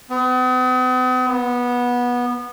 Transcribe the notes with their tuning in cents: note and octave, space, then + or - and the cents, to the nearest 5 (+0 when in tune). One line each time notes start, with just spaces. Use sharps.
B3 +45
B3 -15